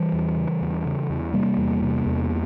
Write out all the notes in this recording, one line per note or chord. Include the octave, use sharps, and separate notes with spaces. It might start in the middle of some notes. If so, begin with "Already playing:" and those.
Already playing: E3 G3
E2
C#3
E2
C#3
E2
C3 G3 A#3
E2
C3
E2